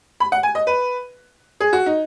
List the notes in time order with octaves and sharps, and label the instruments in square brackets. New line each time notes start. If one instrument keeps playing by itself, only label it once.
[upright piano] B5
F#5
G#5
D#5
B4
G#4
F#4
D#4